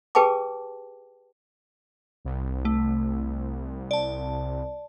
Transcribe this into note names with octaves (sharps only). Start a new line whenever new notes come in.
G4 G#4 B4 G5 A5 D6
C2
A3
D5 A5